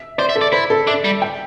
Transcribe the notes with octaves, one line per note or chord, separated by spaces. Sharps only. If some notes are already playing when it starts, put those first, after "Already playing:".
Already playing: E5
C5 D5
E5
A4
D5
E4 C5
A4
D4 E5
G3
G5